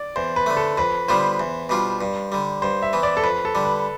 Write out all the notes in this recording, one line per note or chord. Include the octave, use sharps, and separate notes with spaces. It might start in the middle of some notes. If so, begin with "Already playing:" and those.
Already playing: D5
E2 C5
B4
D3 A3
A4
F2 B4
D3 G3 B3 F4 C5
E2
B2 G3 D4 F4
G2
D3 G3
G2 C5
E5
E3 B3
D5
A4
F2 B4
A4
D3 G3
B4